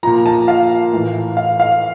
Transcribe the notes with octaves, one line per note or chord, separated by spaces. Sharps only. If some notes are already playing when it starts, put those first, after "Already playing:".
A#2 F3 A#5
A5
F5
A2 E3
F5
F5